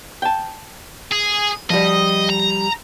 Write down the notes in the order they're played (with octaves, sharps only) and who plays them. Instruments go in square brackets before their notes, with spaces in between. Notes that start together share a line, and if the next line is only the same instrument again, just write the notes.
[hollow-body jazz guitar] G5 A5
[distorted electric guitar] G#4
[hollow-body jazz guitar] F3 G3 [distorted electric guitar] D#5
[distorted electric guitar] A#5